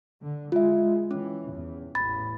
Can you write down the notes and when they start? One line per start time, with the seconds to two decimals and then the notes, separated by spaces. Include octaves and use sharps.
0.22 D3
0.52 G#3 F4 E5
1.11 E3 C#4
1.49 E2
1.95 A1 E2 B5 A6